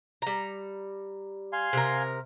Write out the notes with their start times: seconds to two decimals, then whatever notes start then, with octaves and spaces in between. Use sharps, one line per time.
0.22 G3 A#5
1.53 F5 G#5 C6
1.73 C3 A#4